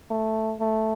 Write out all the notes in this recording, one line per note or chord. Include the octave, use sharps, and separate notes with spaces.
A3
A3